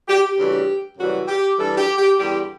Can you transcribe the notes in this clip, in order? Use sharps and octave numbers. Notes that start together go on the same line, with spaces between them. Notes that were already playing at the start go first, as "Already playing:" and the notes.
G4
G4
D2 C#3 E3 G3
F#2 C#3 E3 G3 F#4
G4
G2 E3 G3 A4
G4
G4
E2 D3 G3 G4